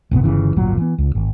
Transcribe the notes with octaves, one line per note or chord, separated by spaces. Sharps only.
D1 G1 C3 B3
G1 C#3 E3
D1 G1 A#2 F#3
E3 B3
C#2
G#1